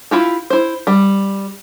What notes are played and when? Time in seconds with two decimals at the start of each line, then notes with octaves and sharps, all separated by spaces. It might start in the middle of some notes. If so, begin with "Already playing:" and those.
0.11 E4 F4 G4
0.50 E4 C5
0.87 G3 G5